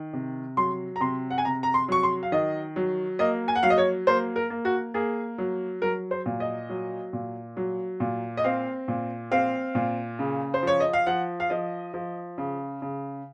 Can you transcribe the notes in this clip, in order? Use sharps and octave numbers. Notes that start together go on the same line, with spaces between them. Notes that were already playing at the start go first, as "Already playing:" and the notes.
Already playing: D#3
C3
F#3 C6
A#5
C3 C6
F#5
G#5
C3 A#5
A#5
C6
F#3 C#6
C6
F5
D#3 D#5
F#3
A#3 D#5
G#5
F#5
F#3 F5
D#5
C#5
A#3 C5
A#4
A#3
F#4
A#3 G#4
F#3
F#3 A#4
C5
A#2
D#5
F#3
A#2
F#3
A#2
D#5
C4 F5
A#2
C4 F5
A#2
C#3
C5
F3 C#5
D#5
F5
F3 F#5
F5
F3 D#5
F3
C#3
C#3